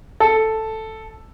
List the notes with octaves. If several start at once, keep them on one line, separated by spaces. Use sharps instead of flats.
A4